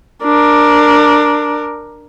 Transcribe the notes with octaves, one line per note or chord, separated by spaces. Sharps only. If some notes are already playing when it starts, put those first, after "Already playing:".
D4 A#4